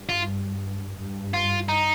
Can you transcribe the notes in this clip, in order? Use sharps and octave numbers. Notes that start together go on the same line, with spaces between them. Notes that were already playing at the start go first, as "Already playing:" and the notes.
Already playing: G2
F4
G2
F4
D#4